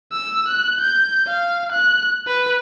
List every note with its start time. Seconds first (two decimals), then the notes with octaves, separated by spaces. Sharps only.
0.12 E6
0.49 F#6
0.81 G6
1.27 F5
1.73 F#6
2.27 B4